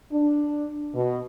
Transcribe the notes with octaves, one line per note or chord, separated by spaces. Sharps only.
D4
B2